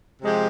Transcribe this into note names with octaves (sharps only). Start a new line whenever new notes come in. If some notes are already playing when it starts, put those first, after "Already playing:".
C3 F3 G#3 C4 G4